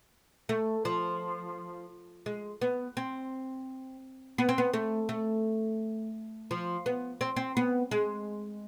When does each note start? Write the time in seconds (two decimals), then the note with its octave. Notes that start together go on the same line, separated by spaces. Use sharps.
0.49 A3
0.85 F3
2.26 G#3
2.61 B3
2.97 C4
4.38 B3
4.49 C4
4.58 B3
4.73 A3
5.09 A3
6.51 F3
6.86 B3
7.21 C4
7.36 C4
7.57 B3
7.91 G#3